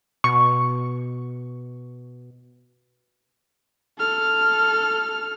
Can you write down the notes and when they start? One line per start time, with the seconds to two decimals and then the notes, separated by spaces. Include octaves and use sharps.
0.24 B2 C#6
3.98 A4 F6